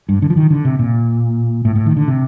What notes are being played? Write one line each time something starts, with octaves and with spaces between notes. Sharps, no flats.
G2
D3
F3
D#3
D3
C3
A#2
A2
A2
D#3
D3
C3